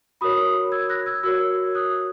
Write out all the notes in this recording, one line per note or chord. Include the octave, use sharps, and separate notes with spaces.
F#4 A#4 C#5 B5 D#6
E6 G#6
F#6 A#6
E6 G#6
F#4 A#4 C#5 E6 G#6
D#6 F#6